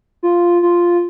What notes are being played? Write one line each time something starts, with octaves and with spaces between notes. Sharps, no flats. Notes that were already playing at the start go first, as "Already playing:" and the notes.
F4
F4